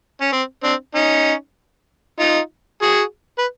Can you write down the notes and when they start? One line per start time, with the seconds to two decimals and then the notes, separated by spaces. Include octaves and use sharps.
0.21 C#4
0.32 C4
0.63 C4 D4
0.95 C#4 D#4
2.19 D#4 F4
2.82 F#4 G#4
3.39 B4